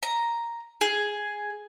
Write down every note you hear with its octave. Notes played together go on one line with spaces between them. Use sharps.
A#5
G#4